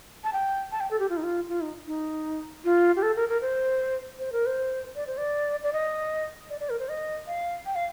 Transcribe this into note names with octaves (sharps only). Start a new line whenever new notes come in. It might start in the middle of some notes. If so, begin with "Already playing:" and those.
A5
G5
A5
G5
A4
G4
F4
D#4
F4
F4
D#4
D#4
F4
G4
A4
A#4
A#4
C5
C5
A#4
C5
D5
C5
D5
D5
D#5
D5
D5
A#4
C5
D#5
F5
G5
F5